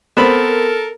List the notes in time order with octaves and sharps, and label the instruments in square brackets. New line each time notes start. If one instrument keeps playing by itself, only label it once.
[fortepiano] B3 C4 B5 [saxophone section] A4 A#4